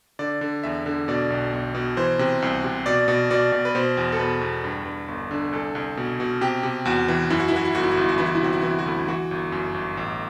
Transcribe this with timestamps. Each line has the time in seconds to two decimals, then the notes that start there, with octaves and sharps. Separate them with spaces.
0.19 D3 D5
0.41 D3
0.63 E2 E5
0.86 D3
1.08 B2 D5
1.30 B1
1.53 B1
1.75 B2
1.97 E3 C5
2.19 C3
2.42 C2
2.64 C3
2.86 B2 D5
3.08 B2
3.30 B2 D5
3.52 B2
3.65 B4
3.75 B2 C5
3.97 E2
4.12 A4
4.19 B2 B4
4.41 E2
4.64 G2
4.86 G2
5.08 G1
5.31 D3
5.53 C2 A4
5.75 C2
5.97 B2
6.20 B2
6.41 C3 G4
6.63 C3
6.85 E2 F#4
7.08 E3
7.30 F#2 E4
7.40 F#4
7.48 E4
7.52 E3 F#4
7.65 E4
7.75 G1 F#4
7.83 E4
7.91 F#4
7.97 G1 E4
8.09 F#4
8.18 E3 E4
8.26 F#4
8.35 E4
8.42 C3 F#4
8.53 E4
8.61 E3 F#4
8.71 E4
8.79 F#4
8.86 D2 E4
9.08 E3 F#4
9.31 G1
9.52 F#2
9.74 G1
9.97 A1